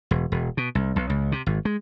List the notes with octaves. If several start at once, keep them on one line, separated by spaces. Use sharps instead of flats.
E1
E1
B2
C2
B1
C#2
C3
G#1
G#3